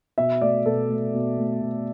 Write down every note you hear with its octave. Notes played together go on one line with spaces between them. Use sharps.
B2 E5
A3 D5
B2 A4
A3
B2
A3
B2